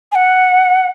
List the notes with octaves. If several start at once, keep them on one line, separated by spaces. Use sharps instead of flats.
G#5
F#5